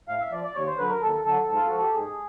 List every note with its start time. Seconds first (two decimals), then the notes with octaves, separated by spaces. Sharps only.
0.08 A2 F5
0.21 E5
0.32 F3 D5
0.44 D5
0.55 D#2 C#5
0.67 C5
0.78 D3 F#3 B4
0.90 A#4
1.01 D#2 A4
1.25 D3 F#3 A4
1.48 G#2
1.55 F4
1.68 F3 F#4
1.82 G4
1.94 G#2 G#4